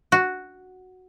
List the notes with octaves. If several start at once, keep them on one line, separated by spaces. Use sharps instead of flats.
F#4